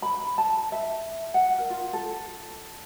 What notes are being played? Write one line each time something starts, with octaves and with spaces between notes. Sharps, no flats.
B5
A5
E5
F#5
A#4
F4
A4